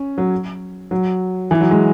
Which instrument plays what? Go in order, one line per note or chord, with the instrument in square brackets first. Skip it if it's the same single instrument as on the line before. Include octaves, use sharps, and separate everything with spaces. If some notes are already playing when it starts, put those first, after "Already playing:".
Already playing: [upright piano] C#4
F#3
F#3
E3
F#3
G#3